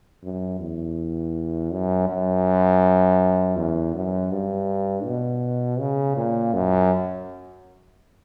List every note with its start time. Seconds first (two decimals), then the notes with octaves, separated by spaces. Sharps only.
0.23 F#2
0.60 E2
1.71 F#2
2.09 F#2
3.57 E2
3.94 F#2
4.31 G2
5.05 B2
5.80 C#3
6.17 A#2
6.54 F#2